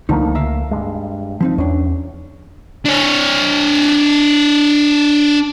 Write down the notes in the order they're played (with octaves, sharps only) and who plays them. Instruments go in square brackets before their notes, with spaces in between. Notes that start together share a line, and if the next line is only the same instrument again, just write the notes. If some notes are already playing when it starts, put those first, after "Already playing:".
[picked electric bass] C#2 A3 A#3 [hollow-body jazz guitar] D3 F3 D#4
[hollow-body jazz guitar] A#4 E5 F5
[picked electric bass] G2 G#3
[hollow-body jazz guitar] F3 C4 D#4
[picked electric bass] E2 [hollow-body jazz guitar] C#4 D4
[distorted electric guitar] D4 C#5